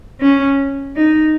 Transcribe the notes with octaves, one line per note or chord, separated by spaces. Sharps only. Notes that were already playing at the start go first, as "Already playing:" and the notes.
C#4
D#4